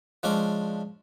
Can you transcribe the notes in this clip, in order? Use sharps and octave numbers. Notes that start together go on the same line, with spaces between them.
F3 G#3 C#4 D4 D5